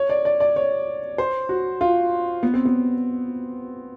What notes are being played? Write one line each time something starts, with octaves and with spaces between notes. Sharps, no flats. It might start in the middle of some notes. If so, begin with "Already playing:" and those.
Already playing: C#5
D5
D5
D5
C#5
C5
F#4
F4
B3
C4
B3